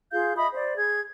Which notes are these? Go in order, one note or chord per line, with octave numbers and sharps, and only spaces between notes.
F4 G#4 F5 G6
D#5 E5 B5 D#6
C5 D5
G#4 G#6